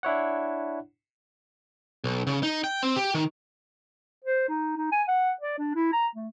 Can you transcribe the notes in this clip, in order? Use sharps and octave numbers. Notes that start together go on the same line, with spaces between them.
D4 E4 C#5 F#5
B1
C#3
D#4
G5
C4
G4
D#3
C5
D#4
D#4
G#5
F#5
D5
D4
E4
A#5
A3